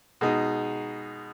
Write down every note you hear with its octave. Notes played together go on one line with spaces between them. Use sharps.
B2 G#3 D#4